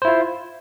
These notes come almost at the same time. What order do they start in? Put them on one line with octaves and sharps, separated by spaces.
C5 E4 F4